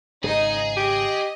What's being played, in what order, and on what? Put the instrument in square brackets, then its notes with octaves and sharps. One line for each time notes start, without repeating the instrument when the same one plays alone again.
[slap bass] G#1 C#3 [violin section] D#4 D#5 [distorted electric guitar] G#4
[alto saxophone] G4 [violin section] D#5